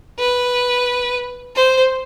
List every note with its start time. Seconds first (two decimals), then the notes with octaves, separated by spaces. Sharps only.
0.19 B4
1.56 C5